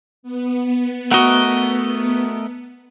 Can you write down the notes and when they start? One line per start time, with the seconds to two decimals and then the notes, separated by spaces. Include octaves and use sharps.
0.23 B3
1.11 A3 F#4 A#4 D#5 F#5